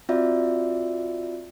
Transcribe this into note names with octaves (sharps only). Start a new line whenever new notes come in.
C4 F4 F#4 D5 E5